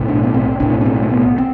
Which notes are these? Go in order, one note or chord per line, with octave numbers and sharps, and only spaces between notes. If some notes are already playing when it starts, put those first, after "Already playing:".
Already playing: B1 A2
D4
B3
C4
B1 A2 D4
D4
C4
A3
B3
C4